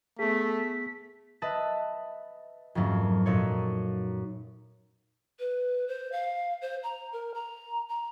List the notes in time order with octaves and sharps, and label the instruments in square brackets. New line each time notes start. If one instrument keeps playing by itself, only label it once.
[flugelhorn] A3 [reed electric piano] B3 G#4 [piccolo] B6
[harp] B4 D#5 E5 A5
F2 G#2 F#3 A3 A#3 C#4
F#2 A#2 D#4 A4 C#5
[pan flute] B4
C5
F5
C5
A#5
A#4
A#5
A#5